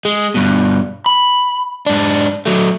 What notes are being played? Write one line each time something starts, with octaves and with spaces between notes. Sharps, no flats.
G#3
G2 B2
B5
G#2 D4
F#3 A3